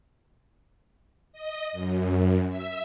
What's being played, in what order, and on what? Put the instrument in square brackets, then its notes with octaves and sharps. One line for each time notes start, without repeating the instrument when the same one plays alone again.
[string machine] D#5
F#2
E5